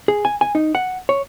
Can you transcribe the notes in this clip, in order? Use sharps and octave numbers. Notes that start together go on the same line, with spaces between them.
G#4
G#5
G#5
D#4
F#5
C#5